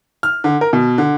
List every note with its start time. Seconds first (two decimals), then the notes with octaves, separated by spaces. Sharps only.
0.23 F6
0.44 D3
0.61 A#4
0.73 B2
0.98 D3